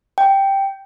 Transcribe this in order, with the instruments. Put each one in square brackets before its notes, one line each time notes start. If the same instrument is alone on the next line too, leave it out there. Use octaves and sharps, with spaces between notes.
[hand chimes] G5